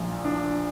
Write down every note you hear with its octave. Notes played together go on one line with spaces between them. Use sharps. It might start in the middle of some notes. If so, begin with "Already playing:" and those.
Already playing: A#1 A#2
D4